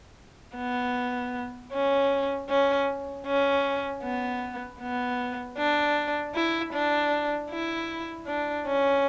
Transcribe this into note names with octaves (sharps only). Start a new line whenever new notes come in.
B3
C#4
C#4
C#4
B3
B3
D4
E4
D4
E4
D4
C#4